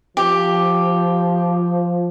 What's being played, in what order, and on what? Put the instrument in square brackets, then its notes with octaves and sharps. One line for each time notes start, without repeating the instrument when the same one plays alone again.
[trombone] F3 [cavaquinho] G4